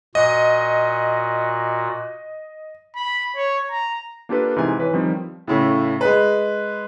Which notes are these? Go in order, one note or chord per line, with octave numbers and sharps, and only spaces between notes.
A#2 F#4 D#5
B5
C#5
A#5
A#3 D4 F4 G4 A4 B4
G#2 C3 E3 G#5
E3 B4 C#5
D#3 F3 G3 C4
A2 C#3 A3
G#3 B4